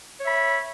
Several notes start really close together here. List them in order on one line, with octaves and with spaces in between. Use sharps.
C#5 E5 B5